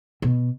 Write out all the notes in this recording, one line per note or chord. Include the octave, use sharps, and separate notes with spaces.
B2